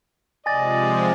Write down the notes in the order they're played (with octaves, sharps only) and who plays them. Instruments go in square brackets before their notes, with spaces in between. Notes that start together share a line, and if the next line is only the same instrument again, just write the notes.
[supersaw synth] C3 F3 G#3 [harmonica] D5 D#5 [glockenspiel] G#5 A6